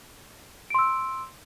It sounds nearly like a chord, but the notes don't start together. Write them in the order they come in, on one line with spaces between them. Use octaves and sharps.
D7 C6 E6